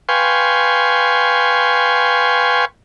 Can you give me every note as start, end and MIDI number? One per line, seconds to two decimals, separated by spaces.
0.09 2.65 71
0.09 2.65 77
0.09 2.65 79
0.09 2.65 80
0.09 2.65 84
0.09 2.65 85